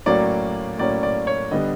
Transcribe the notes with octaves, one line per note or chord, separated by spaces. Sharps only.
A2 F#3 A#3 C#4 D5
A2 F#3 A#3 C#4 D5
D5
C#5
D3 G3 B3 D#5